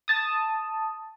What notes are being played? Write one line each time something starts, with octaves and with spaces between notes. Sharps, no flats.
A5 D#6